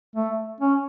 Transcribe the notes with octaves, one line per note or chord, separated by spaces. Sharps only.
A3
C#4